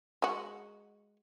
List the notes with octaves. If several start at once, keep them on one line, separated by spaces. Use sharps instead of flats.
G#3 F#4